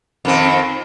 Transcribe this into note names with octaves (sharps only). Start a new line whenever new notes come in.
F2 D#3 C4